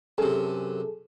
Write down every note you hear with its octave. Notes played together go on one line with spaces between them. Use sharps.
F#2 C3 G#4 A4